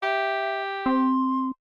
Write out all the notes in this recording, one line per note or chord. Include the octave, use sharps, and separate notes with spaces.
G4 E5
C4 C6